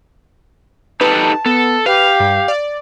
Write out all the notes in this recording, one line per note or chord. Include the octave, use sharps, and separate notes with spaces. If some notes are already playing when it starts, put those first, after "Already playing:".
D#4 G4 A4 B4 A5
B3 A4
G4 B4 F5
G2
D5